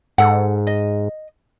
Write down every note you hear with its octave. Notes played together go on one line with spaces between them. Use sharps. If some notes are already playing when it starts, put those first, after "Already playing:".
G#2 A4 F#5
D#5